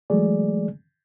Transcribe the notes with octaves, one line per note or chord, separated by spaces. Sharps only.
E3 F#3 G#3 A3 G#4 D5